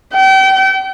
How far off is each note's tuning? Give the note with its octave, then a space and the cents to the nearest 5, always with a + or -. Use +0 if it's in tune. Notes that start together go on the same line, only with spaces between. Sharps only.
G5 -35